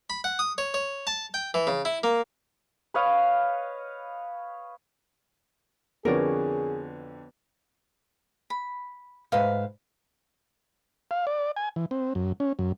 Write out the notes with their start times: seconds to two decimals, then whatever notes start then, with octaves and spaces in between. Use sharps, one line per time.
0.10 B5
0.24 F#5
0.39 D#6
0.58 C#5
0.74 C#5
1.07 A5
1.34 G5
1.54 E3
1.67 C#3
1.85 E4
2.03 A#3
2.94 B4 C#5 D#5 F5
6.05 F2 D3 B3 F#4 G#4 A#4 C#5 D5
8.50 B5
9.32 G#2 B4 D#5 F5
11.11 F5
11.27 D5
11.56 G#5
11.76 E3
11.91 C4
12.15 F#2
12.40 C#4
12.59 F#2